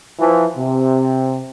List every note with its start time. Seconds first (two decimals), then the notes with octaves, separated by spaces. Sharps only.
0.20 E3 F3
0.57 C3